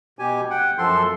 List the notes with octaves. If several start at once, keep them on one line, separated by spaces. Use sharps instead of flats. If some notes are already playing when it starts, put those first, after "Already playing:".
B2 G4 G#5
F#5 G5
F#2 F3 A4 C6